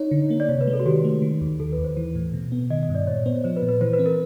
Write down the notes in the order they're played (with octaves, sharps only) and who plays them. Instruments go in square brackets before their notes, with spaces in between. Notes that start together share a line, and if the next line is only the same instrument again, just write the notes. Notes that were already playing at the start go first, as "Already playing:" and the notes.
Already playing: [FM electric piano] D#4 [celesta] C#5
[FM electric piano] D3
A#3
[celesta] D5
[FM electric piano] C3 [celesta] C#5
[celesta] B4
[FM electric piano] G#3
[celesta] A4
F#4
[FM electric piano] D#3 [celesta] G4
[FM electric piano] A3
D#3
D#2
[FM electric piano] D#3 [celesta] A4
[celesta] B4
[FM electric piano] D#2
[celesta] C5
[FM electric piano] E3
A2
B2
B3
[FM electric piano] D#3 [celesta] D#5
[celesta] D#5
[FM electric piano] G2
[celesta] D5
[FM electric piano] A#2 [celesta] C#5
[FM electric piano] B3 [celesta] C5
[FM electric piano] F3 [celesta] C5
[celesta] B4
[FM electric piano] A#2
[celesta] B4
[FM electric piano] E3 [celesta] C5
[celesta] B4
[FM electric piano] C4
[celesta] A#4